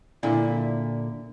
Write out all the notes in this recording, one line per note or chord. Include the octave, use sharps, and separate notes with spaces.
A#2 D3 E4